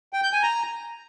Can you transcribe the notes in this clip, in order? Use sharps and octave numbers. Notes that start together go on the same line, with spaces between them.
G5
G6
G#5
A#5